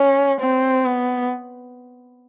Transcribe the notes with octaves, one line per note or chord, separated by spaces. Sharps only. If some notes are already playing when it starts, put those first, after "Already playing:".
Already playing: C#4
C4
B3